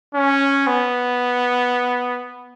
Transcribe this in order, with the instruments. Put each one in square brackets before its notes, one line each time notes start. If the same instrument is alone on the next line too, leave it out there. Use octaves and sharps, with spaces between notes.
[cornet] C#4
B3